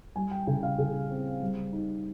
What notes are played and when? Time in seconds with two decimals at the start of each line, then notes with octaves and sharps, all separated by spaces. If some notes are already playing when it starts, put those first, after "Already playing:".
0.16 G3 G#5
0.31 G5
0.47 C#3 G5
0.63 F5
0.78 C#3 G#4
1.10 C4
1.41 G3
1.73 D#4